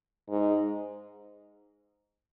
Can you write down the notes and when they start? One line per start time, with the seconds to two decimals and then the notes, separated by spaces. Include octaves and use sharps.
0.30 G#2